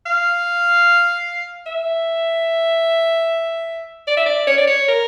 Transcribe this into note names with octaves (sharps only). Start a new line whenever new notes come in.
F5
E5
D5
E5
D5
C#5
D5
C#5
A#4